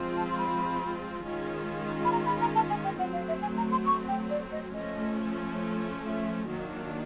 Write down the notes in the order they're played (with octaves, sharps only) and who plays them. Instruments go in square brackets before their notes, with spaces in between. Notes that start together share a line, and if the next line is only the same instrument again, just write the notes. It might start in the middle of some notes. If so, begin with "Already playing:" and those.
Already playing: [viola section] F3 G#3 C4 F4
[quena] A5
C6
B5
[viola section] D#3 G#3 C#4 F4
[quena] B5
A#5
B5
A#5
A5
G#5
G5
[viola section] F#3 A3 C4 [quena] F#5
[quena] F5
E5
G#5
A#5
C6
C#6
G5
D5
D#5
[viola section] F3 A3 C#4 [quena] D#5
[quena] E5
[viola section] D#3 F#3 A#3 D4